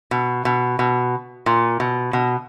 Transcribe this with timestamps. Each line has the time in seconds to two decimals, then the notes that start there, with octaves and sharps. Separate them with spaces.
0.11 B2
0.45 B2
0.79 B2
1.46 A#2
1.80 B2
2.13 B2